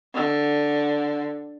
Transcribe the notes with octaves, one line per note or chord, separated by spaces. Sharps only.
D3